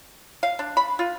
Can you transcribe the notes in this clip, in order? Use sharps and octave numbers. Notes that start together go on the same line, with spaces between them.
F5
D4
B5
F4